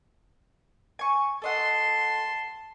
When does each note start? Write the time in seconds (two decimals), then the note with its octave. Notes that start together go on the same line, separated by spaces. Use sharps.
0.99 G#5 C#6
1.42 A4 D#5 F#5 A5 C6